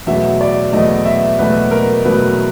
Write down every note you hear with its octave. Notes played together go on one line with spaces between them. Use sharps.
E2 B2 F#3 A3 E5
D5
E2 B2 F#3 A3 D#5
E5
E2 B2 F#3 A3 B4
A#4
E2 B2 F#3 A3 B4